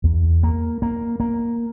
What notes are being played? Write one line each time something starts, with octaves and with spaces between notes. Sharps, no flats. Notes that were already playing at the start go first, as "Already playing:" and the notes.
E2
A#3
A#3
A#3